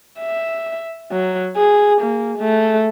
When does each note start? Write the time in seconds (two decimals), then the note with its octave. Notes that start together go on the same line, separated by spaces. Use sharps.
0.20 E5
1.12 F#3
1.57 G#4
2.02 A#3
2.38 A3